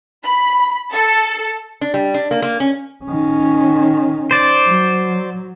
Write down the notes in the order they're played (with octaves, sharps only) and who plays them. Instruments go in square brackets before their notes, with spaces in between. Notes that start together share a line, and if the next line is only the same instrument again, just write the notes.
[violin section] B5
A4
[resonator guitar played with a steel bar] D4
G3
D4
A#3
A#3
C#4
[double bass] D#3 C#4
[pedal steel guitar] C5 D5
[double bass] F#3